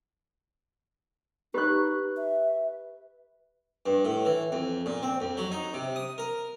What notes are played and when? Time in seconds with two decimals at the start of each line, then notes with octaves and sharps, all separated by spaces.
1.54 D#4 G4 B4 D#5 C#6 F#6
2.17 E5
3.86 G2
4.05 A2
4.25 E3
4.52 F2
4.86 A#2
5.03 C4
5.20 F2
5.37 F#3
5.52 D#4
5.73 C3
5.96 D#6
6.18 A#4